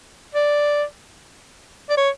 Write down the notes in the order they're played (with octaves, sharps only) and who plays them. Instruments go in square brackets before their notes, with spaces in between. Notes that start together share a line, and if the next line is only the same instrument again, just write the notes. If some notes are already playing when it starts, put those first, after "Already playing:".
[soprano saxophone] D5
D5
C#5